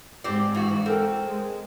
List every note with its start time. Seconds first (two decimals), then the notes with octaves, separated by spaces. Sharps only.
0.24 G#2 C4 G4 D5
0.55 G2 E3 F#4
0.86 C4 A4 A#4 G5
1.24 G#3